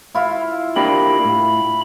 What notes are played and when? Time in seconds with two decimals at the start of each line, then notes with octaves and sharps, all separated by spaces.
0.14 E4 F4 E5
0.76 A#3 D4 G4 B5
1.25 A2